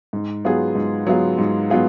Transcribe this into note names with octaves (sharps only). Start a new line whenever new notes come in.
G#2
F#3 B3 F4 G#4
G#2
F#3 B3 F4 G#4
G#2
F#3 B3 F4 G#4